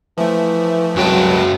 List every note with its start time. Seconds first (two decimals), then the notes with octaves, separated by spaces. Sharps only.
0.18 E3 F3 A3
0.96 C2 F#2 F#3 G#3 F#4 B4 G5 A5